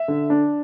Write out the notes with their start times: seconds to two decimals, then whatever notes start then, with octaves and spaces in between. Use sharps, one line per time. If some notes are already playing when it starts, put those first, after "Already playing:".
Already playing: E5
0.08 D3
0.30 D4